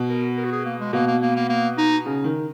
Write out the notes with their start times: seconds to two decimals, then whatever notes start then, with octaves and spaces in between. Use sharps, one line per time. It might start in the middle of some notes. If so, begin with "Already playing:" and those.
Already playing: B2
0.09 A#4
0.37 A#4
0.45 F#4
0.52 G#4
0.65 A#3
0.80 G#3
0.93 B2 A#3
1.07 A#3
1.22 A#3
1.36 A#3
1.49 A#3
1.78 D#4
2.06 C#3
2.24 D#3